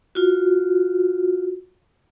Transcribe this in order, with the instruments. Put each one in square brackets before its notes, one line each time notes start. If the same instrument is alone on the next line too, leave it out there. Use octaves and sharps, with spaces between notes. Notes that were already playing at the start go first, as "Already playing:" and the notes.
[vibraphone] F4 F#4